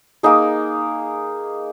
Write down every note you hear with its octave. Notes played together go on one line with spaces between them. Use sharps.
A#3 D#4 G#4